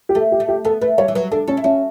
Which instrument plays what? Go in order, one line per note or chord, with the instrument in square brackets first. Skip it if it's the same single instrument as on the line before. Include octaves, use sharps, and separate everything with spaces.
[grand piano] G4
[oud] A3 [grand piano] A4
[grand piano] G4
[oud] A3
[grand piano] G4
[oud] B3 [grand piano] A4
[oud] A3 [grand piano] B4
[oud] G3 [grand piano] C#5
[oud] E3
[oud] F#3 [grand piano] B4
[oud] D4 [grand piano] A4
[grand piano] C#4 [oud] A4
[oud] E4
[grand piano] C#4 [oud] F#4